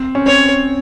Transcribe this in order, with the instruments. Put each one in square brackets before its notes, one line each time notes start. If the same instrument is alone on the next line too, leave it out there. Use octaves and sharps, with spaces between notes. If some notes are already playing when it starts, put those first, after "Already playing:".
Already playing: [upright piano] C4
C#4
[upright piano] C4 [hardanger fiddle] C#5